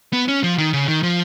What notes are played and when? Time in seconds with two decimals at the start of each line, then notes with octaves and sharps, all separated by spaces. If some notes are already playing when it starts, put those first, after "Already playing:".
0.13 B3
0.28 C#4
0.43 F3
0.58 D#3
0.73 C#3
0.88 D#3
1.03 F3